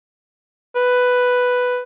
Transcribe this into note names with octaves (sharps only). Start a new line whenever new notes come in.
B4